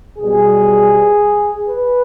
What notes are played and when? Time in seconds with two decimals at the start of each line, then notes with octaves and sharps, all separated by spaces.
0.19 B1 B2 G3 G#4
1.68 B4